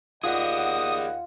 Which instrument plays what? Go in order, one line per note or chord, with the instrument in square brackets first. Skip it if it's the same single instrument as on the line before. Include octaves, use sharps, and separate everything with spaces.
[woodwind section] D#2 D#5 F#5 [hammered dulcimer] F4 [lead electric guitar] G#4 D5 [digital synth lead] D#6